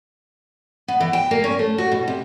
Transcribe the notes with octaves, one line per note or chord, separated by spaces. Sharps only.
B3
E3
G5
A#3
C#4
A3
F#4
B2
C3